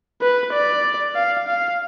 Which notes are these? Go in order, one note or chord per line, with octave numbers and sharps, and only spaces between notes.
B4
D5
F5
F5